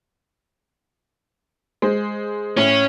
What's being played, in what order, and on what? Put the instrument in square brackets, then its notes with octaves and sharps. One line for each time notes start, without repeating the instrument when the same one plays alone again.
[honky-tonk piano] G#3 C5
[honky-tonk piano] A2 [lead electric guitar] C#4